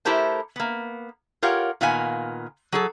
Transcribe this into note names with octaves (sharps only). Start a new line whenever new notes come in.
A3 E4 G4 A#4 C5 A5
A#3 B3
F4 G4 A#4 C#5 F5 F#5
A#2 D#3 B3 F5 G#5
F#3 G#4 A4